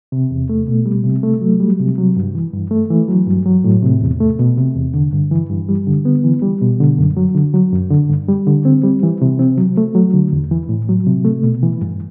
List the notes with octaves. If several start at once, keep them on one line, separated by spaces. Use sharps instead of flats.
C3
E2
A3
B2
G3
C3
A3
F#3
G3
C3
F#3
G2
E3
G2
A3
E3
F#3
G2
F#3
A2
C3
E2
A3
B2
C3
E2
D3
G2
E3
G2
G3
D3
B3
E3
G3
B2
D3
F#2
F#3
D3
F#3
F#2
D3
G2
G3
D3
C4
G3
E3
C3
C4
F#3
A3
F#3
D3
E2
E3
A2
F#3
C3
A3
B2
E3
G2